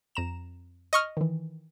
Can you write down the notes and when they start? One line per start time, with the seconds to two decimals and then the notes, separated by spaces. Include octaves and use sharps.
0.15 F2 A#5 E7
0.93 D#5 C#6 F6
1.17 D#3 E3